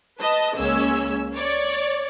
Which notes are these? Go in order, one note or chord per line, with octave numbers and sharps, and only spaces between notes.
B4 D#5 A5
C#2 G#3 A#3 C#4 E6 G#6
C#5 D5